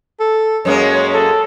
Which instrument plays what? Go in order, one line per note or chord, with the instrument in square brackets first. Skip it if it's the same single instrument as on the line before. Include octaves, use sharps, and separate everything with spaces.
[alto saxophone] A4
[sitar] F#2 G#3 A#3 [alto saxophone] C#5
[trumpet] A4